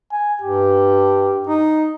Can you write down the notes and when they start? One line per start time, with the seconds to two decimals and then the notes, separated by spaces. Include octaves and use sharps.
0.12 G#5
0.42 G2 G4
1.47 D#4